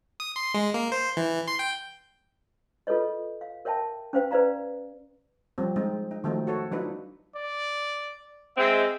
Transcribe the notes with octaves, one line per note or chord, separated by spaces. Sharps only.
D#6
C6
G#3
A#3
C5
E3
C6
G5
F4 A4 B4 C#5 D#5
F5
A#4 C#5 E5 G5 A5
C#4 B4 C5 F5 G5
B4 C5 D5 F5 A#5
F3 G3 C4
G#3 C4 D#4
D#4
D#3 F3 F#3 A3 C4 D#4
F#4 A4 C#5
F#3 D4 D#4 F4 B4
D5
G#3 C4 E5